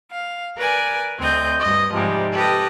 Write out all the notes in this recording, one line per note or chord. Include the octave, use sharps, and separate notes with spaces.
F5
A#4 B4 D5 G#5
D2 C4 D#5 G6
G2 D#5
G#2 C3 F3 G3
G4 A4 B4 D#5